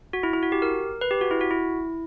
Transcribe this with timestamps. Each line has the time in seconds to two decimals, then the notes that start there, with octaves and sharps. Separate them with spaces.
0.13 F#4
0.23 E4
0.33 E4
0.43 F#4
0.52 G4
0.62 A#4
1.01 B4
1.11 G4
1.21 F#4
1.31 E4
1.41 F#4
1.51 E4